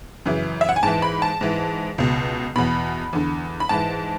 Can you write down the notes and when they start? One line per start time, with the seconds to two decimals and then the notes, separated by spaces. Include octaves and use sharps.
0.26 F#2 C#3 E3
0.61 E5
0.69 F#5
0.76 G#5
0.83 G#2 E3 A5
1.02 B5
1.22 A5
1.41 G#2 E3
1.98 C#2 B2
2.56 E2 B2 B5
3.13 E2 D3
3.60 B5
3.69 G#2 E3 A5